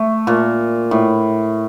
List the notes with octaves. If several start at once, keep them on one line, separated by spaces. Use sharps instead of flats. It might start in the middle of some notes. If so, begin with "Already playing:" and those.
Already playing: A3
A#2
A2